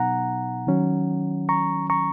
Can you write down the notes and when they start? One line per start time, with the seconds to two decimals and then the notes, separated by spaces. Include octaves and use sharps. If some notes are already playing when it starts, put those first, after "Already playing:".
Already playing: B2 F#3 B3 D#4 F#5 A#5
0.67 D#3 F#3 C#4
1.49 A#5 C#6
1.90 A#5 C#6